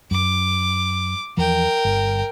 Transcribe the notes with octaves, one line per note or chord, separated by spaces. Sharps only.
F#2 D6
E2 F3 A#4 G5
G1